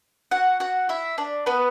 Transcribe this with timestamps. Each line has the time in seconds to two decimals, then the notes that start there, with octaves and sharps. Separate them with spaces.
0.31 F#4 F#5
0.60 F#4 F#5
0.89 E4 E5
1.18 D4 D5
1.46 B3 B4